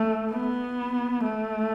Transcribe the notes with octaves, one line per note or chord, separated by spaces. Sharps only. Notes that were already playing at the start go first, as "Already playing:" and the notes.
Already playing: A3
B3
A3